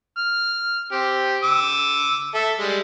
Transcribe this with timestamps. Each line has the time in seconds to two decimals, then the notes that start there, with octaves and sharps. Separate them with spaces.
0.17 F6
0.92 C4 G4
1.43 D6 E6
2.34 A4 E5
2.60 G3 G#3